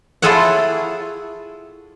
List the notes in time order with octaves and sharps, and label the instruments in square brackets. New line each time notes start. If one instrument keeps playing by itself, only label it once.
[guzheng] E4 F4 G#4 A4 C#5 F#5